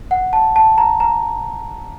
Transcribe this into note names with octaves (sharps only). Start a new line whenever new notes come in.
F#5
A5
A5
A#5
A#5